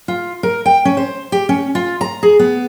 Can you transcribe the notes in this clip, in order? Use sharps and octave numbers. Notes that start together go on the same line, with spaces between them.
F4
A#4
G5
C#4
C5
G4
C#4
F4
A#5
G#4
B3